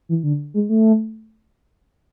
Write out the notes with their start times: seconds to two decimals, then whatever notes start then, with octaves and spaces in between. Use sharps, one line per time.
0.09 E3
0.23 D3
0.54 G#3
0.69 A3